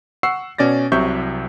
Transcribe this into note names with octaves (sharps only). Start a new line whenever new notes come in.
F#5 C#6 E6 C7
B2 C#4 D5 A6 A#6
C2 C3 F#3 E5 C#6 G6